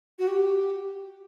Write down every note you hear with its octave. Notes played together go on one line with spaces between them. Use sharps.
F#4
G4